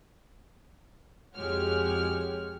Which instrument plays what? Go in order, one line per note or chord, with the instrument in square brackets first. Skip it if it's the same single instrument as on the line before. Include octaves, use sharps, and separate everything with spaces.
[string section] F2 G#3 F#4 G4 C#5 F6